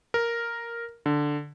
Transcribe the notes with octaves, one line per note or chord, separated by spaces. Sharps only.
A#4
D3